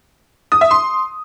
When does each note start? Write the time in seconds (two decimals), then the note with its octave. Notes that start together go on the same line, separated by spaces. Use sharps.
0.52 D#6
0.61 E5
0.71 C6